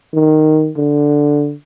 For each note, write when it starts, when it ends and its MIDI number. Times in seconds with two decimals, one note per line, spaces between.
0.13 0.71 51
0.77 1.53 50